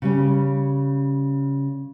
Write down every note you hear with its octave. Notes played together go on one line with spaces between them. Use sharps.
C#3 G3 C#4